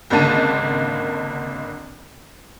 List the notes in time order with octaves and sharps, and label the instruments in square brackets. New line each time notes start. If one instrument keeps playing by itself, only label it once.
[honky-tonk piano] G#1 C#2 D3 A#3 A5 D#7